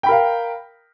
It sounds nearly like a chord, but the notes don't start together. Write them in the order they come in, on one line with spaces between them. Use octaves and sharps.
G5 B5 A#4 F5